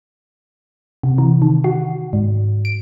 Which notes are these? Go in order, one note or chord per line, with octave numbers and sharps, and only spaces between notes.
C3
E3
D#3
F#4
G#2
D7